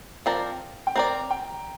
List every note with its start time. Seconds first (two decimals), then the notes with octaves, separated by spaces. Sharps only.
0.26 F3 C4 A#4 D5
0.87 G5
0.96 C4 A#4 D5 A#5
1.31 G5